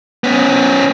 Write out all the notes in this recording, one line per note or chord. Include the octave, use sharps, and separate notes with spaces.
B3 C#4